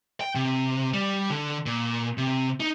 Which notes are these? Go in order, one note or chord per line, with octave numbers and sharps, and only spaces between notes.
G5
C3
G3
D3
A#2
C3
D#4